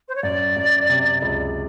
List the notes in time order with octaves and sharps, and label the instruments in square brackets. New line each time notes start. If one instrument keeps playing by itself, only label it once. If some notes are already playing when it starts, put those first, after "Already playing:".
[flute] C5
C#5
[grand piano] F#2 [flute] D5
[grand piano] F#2
C3
C#2